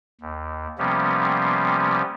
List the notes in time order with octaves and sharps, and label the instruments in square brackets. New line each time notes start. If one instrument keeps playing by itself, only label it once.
[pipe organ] D#2
C3 F3 G3 A#3 B3 C#4